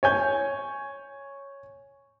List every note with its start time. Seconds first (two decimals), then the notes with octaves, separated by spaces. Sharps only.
0.03 C#5 G#5 G6